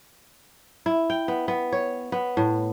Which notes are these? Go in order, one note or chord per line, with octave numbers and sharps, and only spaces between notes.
E4
G5
B3
B3
C#5
B3
A2